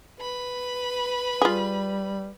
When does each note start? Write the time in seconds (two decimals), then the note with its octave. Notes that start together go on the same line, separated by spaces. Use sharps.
0.19 B4 B5
1.42 G3 F4 G#4